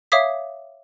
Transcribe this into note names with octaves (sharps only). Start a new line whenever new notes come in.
C#5 E5 F5 D6 D#6 B6